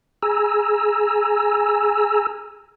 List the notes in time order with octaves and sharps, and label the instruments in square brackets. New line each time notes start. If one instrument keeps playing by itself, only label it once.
[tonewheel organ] G#4 G#5 A#5 E6